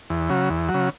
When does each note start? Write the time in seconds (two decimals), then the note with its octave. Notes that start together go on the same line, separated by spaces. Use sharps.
0.10 E2
0.29 C#3 F#3
0.50 E2
0.69 F#3
0.74 C#3